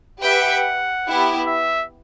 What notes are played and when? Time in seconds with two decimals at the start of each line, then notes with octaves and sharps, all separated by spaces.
0.22 G4 B4 E5 F#5 G5
1.06 B3 E4 G4
1.47 E5